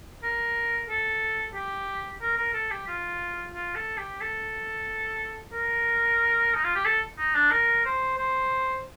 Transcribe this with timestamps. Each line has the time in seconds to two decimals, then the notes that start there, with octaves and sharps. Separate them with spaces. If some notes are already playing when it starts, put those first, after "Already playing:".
0.23 A#4
0.89 A4
1.54 G4
2.22 A#4
2.37 A#4
2.54 A4
2.71 G4
2.88 F4
3.54 F4
3.75 A4
3.98 G4
4.21 A4
5.53 A#4
6.55 D#4
6.64 F4
6.75 G4
6.85 A4
7.18 D#4
7.35 D4
7.52 A#4
7.85 C5
8.18 C5